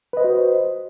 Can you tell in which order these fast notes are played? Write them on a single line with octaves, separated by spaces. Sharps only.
B4 D#5 C5 F#4